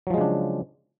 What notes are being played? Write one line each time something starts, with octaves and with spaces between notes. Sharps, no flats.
C#3 F3 F#3 G#3 D4